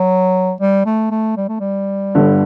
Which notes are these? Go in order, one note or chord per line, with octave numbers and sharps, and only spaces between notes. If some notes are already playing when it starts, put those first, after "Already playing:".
Already playing: F#3
G3
A3
A3
G3
A3
G3
G1 G2 D3